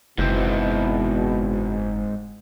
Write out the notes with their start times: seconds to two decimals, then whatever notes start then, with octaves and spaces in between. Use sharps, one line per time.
0.18 F#1 E2 G#2 B2 C4 E4